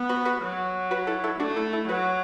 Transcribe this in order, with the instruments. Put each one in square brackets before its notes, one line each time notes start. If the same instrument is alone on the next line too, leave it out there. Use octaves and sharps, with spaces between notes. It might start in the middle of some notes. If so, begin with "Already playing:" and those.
Already playing: [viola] B3
[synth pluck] F#4 B4
F#4 B4
[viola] F#3
[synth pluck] F#4 B4
E4 A4
E4 A4
[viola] A3 [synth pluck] D4 F#4
[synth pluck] E4 A4
E4 A4
[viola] F#3 [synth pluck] F#4 B4